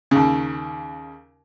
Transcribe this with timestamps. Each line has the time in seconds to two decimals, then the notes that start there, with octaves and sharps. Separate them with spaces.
0.11 D#2 C#3